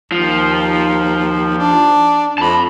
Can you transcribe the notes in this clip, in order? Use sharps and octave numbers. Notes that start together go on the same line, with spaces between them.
D#2 F3
D4
F2 A5 B5